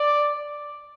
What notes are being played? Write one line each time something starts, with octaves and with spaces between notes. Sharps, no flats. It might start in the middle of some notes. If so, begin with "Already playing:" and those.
Already playing: D5